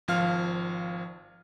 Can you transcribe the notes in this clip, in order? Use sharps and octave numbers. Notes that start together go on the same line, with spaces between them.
G#1 F3 F5 F6